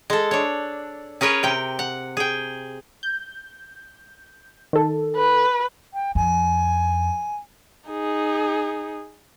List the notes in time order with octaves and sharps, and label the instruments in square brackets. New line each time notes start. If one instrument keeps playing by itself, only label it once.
[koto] G#3 A4
D4 C#5
C#4 G#4 A#4 B4 C#5
C3 G5
F#5
G#4 G5
[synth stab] G6
D#3 A4
[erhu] B4
[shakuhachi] G5
[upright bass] F2 [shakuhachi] G#5
[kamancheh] D#4 G#4